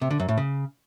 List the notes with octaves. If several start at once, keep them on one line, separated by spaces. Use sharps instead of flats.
C3
D3
F#2
A2
C#3